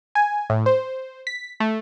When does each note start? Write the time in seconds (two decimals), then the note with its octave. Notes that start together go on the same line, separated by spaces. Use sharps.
0.15 G#5
0.50 A2
0.66 C5
1.27 B6
1.60 A3